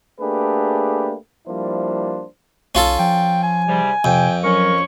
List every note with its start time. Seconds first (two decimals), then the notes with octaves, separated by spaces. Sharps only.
0.20 A3 A#3 D4 G4 G#4 B4
1.47 F3 G3 A#3 D4 E4 C5
2.75 B1 C#4 F4 A4
2.99 F3 G5
3.43 G#5
3.67 G#2 C3 G3
4.04 F2 C3 G5
4.44 F#3 C#4 A#4 C#6